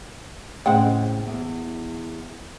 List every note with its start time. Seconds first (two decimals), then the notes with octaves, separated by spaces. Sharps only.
0.66 A2 C#3 G#3 C4 F#5 G5
1.26 E2